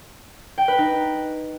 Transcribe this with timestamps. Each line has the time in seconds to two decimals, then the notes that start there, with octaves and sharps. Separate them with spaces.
0.58 G5
0.68 B4
0.78 D#4